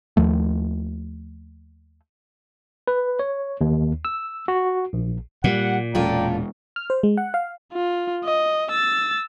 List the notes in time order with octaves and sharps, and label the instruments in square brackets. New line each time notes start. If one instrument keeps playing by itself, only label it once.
[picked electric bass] D#2 F3 A3
[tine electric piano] B4
C#5
D#2
E6
F#4
A#1
[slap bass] A#2 [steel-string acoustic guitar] G3 [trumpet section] F#5
[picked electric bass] E1 G#3 [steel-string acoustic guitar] C#4 F4 A4 [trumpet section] D5 G5 A#5
[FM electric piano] F6
C5
G#3
F#5
F5
[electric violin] F4
D#5
E6 A6